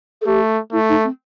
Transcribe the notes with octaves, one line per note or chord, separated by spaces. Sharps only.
A4
A3 G4
A3 E4
D#4
C4